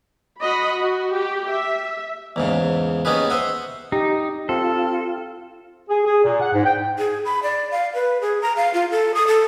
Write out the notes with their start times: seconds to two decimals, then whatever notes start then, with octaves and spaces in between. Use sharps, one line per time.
0.42 F#4 D#5 B5
0.80 F#4
1.14 G4
1.48 E5
2.36 E2 G#2 C#3
3.05 B3 C#4 D#4 G4 G#4 B4
3.30 C5 E5 F#5 D#6
3.92 D#4 G4
4.49 C4 F4 A4
5.90 G#4
6.06 G#4
6.24 A#2
6.41 F#5
6.53 G#2
6.65 G5
6.99 G#4
7.25 B5
7.43 D5
7.71 F5
7.94 B4
8.21 G#4
8.42 A#5
8.57 F5
8.74 F4
8.91 A4
9.14 D#6
9.28 A4